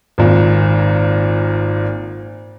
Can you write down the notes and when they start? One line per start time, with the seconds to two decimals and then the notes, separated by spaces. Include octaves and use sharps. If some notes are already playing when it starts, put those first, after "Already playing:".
0.18 G#1 A#2